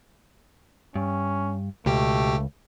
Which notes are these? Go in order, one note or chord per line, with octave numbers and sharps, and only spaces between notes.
G2 C#4
C#2 B2 A3 G4 G5